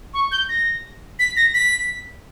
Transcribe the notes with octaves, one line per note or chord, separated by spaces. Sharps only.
C#6
G6
A#6
B6
A#6
B6